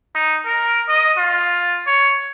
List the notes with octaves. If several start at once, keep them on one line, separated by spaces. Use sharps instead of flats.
D#4
A#4
D#5
F4
C#5